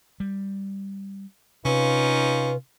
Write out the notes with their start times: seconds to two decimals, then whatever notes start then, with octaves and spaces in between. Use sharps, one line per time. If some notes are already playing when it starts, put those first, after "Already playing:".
0.20 G3
1.65 C3 C#4 D#4 F4 B4